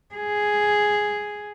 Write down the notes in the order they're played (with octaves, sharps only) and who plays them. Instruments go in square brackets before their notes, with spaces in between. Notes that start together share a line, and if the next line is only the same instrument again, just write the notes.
[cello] G#4